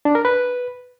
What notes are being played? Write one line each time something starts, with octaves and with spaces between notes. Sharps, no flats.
D4
A#4
B4